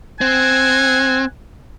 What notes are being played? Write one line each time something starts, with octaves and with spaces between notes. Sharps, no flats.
C4 F#5 G#5